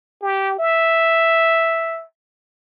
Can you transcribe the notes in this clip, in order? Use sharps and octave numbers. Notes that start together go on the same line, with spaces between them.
G4
E5